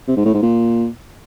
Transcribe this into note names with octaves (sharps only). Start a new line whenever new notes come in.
C3
G#2
A2
G#2
A#2